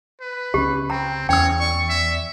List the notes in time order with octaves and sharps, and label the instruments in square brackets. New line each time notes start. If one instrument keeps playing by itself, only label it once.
[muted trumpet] B4
[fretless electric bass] C#2 C#4 [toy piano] G4 [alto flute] B5
[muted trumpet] C4 [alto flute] G5 [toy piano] A#5
[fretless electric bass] E2 [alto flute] C#4 [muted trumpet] C#5 [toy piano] G5 E6
[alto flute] D5 [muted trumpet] C#6
[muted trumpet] E5